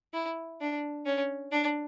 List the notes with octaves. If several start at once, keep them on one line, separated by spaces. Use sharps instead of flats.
E4
D4
C#4
D4